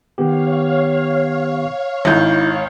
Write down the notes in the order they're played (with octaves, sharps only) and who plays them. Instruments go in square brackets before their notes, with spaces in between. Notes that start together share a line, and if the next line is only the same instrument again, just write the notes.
[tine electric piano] D#3 B3 G4 [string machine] C#5 F5
[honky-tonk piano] G#1 G6 [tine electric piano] D#4 E4